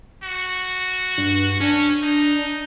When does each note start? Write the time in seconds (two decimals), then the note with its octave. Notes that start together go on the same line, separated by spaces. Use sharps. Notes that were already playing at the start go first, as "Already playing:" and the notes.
0.23 F#4
1.18 G2
1.60 C#4 D4
2.03 D#4